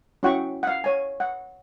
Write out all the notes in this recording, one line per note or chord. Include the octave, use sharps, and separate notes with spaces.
C#4 E4 F#4 F#5 G5 C#6
F5 F#5
C#5 G#5
F#5